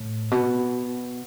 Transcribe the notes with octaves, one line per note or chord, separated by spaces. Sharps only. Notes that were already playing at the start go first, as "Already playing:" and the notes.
Already playing: A2
B2